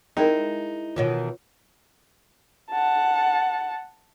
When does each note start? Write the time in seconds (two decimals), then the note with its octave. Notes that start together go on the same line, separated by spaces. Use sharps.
0.17 G#3 D#4 E4 A#4 G5
0.96 B2 D#3 E3 F4 C#5
2.71 F#5 A5